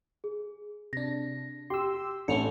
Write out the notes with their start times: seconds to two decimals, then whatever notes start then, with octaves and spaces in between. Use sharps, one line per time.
0.24 G#4
0.93 C3 D4 A#6
1.70 G4 C6 E6
2.28 A1 A3 C#4 A4 C#7 F7